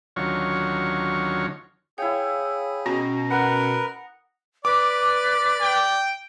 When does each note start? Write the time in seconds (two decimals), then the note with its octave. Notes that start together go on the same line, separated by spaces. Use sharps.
0.16 D2 D#3 F#3 C#4 F4 C#5
1.98 E4 G#4 C#5 F5 G5
2.86 B2 C#4 A#5 D#6
3.30 A#4 B4 F#5
4.65 B4 D5 D6
5.62 G5